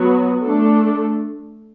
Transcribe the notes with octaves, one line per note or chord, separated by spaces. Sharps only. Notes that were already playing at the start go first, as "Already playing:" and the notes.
Already playing: F#3 B3 F#4
A3 D4 A4